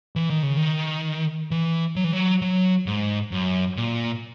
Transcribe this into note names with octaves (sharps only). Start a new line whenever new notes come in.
E3
D#3
C#3
D#3
E3
F#3
E3
F#3
F#3
G#2
F#2
A#2